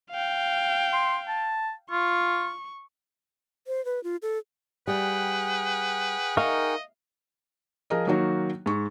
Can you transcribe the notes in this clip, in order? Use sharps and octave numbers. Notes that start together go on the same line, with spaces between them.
F5 G5
C6
A5
F4 C#6
C5
B4
F4
A4
G3 G#4 B4 F#5 G5
D#4 A#4 D#5 F5 C#6
F3 G#4 A#4 D#5
D#3 F#3 A#3 D#4 F#4 C#5
G#2 C#6